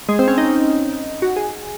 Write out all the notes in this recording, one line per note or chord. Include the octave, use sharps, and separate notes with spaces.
G#3
C4
C#4
D#4
F#4
G#4